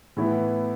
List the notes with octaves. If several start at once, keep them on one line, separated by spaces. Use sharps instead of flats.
A2 E3 B3 E4